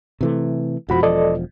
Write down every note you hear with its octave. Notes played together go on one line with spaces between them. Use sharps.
C3 E3 A3
E1 F2 F3 F#4 B5
A4 D5 D#5